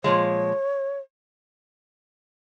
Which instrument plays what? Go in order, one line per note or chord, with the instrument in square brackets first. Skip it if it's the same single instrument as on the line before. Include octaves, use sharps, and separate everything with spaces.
[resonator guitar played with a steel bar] A#2 F3 G#3 [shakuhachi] C#5